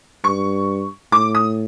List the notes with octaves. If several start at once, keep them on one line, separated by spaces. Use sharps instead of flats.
G2 C#6
A2 D6
D#6